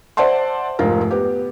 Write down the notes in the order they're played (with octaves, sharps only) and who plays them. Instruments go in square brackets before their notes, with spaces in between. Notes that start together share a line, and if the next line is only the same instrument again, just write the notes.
[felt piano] C5 D5 E5 F#5 A5 C6
F1 G#2 F4 A#4
B3 G4